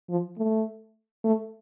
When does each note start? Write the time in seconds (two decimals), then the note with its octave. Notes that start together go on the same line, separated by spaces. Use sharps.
0.10 F3
0.38 A3
1.24 A3